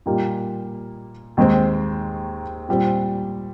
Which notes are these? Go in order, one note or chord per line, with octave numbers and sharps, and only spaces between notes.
A#2 G3 A#3 D#4 G4
D#2 D#3 G#3 C4
A#2 G3 C4